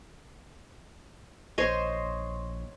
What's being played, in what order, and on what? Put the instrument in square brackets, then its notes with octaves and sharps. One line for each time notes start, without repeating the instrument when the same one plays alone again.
[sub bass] A#1 [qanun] C5 C#5 D#5